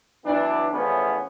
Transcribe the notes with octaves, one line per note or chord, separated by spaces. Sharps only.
E3 F#3 B3 D4
E2 A2 F3 B3 C#4